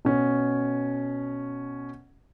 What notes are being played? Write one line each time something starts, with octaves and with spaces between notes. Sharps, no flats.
B2 C#4